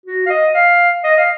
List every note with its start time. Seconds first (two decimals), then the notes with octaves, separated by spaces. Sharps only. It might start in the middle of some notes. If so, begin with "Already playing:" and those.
0.06 F#4
0.26 F5
0.30 D#5
0.54 F5
1.04 D#5
1.17 F5